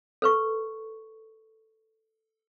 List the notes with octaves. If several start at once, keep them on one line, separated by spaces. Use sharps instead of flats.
A4 B4 C#6